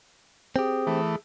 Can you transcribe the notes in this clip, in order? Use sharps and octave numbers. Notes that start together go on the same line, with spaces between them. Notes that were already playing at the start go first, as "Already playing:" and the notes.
C4 G4 G#4
E3 A3